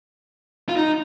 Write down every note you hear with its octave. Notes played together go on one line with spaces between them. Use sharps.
F4
D#4